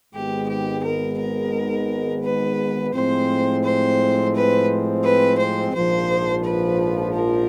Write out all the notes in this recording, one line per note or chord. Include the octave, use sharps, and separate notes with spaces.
G#1 G#2 D#3 G#3 B3 G4
G4
A#4
A#4
B4
A2 F3 G#3 C4 C5
C5
B4
B4
C5
A#1 G#2 F3 C5
B4
A#4